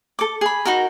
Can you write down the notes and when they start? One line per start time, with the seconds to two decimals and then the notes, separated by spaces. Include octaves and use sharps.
0.19 A4 D6
0.41 G#4 B5
0.65 D#4 F#4 A#4